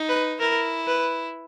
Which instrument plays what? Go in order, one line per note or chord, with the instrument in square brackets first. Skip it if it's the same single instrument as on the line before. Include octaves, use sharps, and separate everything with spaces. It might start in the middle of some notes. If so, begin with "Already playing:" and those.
Already playing: [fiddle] D#4
[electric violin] B4
[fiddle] E4 [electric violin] A#4
[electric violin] B4